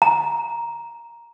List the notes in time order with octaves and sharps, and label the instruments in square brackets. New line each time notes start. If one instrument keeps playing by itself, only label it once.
[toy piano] A#5